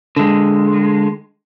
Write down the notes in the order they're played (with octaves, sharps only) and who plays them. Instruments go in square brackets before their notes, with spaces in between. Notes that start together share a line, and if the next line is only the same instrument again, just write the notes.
[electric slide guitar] D3 G#3